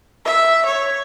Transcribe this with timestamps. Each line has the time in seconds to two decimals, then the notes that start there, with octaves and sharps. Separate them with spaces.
0.25 E5
0.65 C#5